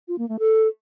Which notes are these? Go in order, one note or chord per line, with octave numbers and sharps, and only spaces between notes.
F4
A#3
A3
A4